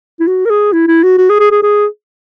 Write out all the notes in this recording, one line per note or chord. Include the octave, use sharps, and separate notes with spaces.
E4
F#4
A#4
G#4
E4
E4
F#4
F#4
G#4
G#4
G#4
G#4